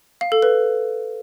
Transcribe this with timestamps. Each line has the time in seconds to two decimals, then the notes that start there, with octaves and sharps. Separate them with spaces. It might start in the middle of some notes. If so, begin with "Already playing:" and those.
0.21 F5
0.32 A4
0.42 B4